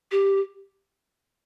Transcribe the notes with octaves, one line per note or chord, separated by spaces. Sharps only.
G4